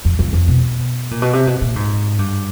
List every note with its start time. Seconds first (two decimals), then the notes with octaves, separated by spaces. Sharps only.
0.05 F2
0.19 F2
0.33 F2
0.48 B2
1.11 A#2
1.22 B2
1.33 C3
1.47 B2
1.61 A#2
1.76 G#2
2.19 G2